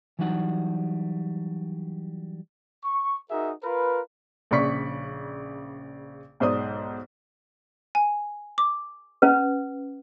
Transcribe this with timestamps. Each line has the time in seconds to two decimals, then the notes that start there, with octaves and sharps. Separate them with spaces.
0.19 E3 F#3 G3 D#4 F#5
2.84 C#6
3.31 D#4 F#4 G#4 A#4 E5
3.64 F4 A#4 B4
4.51 A#1 C#3 D5 C#6 B6
6.40 B1 G#2 C5 D5 D#6
7.95 G#5
8.58 D6
9.22 C#4 B4